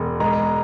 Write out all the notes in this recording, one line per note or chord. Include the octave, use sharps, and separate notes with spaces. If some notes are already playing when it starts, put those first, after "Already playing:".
Already playing: E1
G#3 A#5